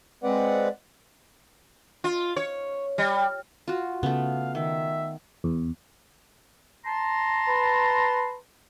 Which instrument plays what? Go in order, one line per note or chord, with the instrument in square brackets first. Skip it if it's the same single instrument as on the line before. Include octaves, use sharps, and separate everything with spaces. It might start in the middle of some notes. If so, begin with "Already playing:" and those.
[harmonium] G#3 C4 B4 D5 F#5
[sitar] F4
C#5
G3
[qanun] F4 F#4
[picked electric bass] C#3 [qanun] A3 B3 [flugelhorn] F5
[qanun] D#3 [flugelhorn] E5
[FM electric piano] E2
[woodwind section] A5 A#5 C6
[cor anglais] B4